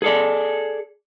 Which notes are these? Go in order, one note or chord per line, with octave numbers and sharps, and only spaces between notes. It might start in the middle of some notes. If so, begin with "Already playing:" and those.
G#4 A4 D5